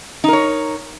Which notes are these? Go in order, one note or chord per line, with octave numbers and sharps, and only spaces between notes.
D#4 A#4 C#5